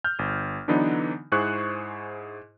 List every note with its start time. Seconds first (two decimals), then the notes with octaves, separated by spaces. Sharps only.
0.04 F6 G6
0.19 G1
0.68 D3 E3 F#3 B3 D4 D#4
1.32 G#2 E4 G#4 C5 C#6 F#6